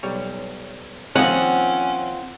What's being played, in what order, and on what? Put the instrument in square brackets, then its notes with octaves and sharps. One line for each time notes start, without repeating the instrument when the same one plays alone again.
[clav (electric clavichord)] B1 G3 C#5
[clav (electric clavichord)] D#3 F3 A#3 [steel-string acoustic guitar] C4 F4 [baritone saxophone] C#4 [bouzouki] F#5